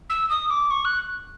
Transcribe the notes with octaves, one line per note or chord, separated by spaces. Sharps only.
E6
D#6
D6
C#6
F#6